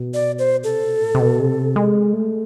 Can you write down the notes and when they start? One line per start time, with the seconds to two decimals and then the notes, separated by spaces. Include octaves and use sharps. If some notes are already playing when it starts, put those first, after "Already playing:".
Already playing: B2
0.14 D5
0.39 C5
0.63 C3 A4
0.82 B2
1.02 A2
1.15 C3
1.20 B2
1.39 C3
1.76 G#3
2.13 A3